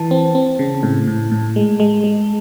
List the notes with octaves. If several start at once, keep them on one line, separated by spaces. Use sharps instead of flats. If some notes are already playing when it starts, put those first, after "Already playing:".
Already playing: E3 A5
C4
C4
C#3
A2
A2
A2
G#3
G#3
G#3